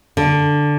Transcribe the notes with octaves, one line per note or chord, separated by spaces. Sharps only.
D3